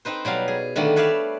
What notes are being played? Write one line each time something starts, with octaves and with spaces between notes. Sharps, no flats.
C4 D#4 B4 C5
B2 F#3 G3 F5
G#4
D3 D#3 G3 A3 A#3
B4 C#5 D5 E5 F5